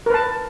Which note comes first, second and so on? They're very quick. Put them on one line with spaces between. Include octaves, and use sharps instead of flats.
A#4 B4 A5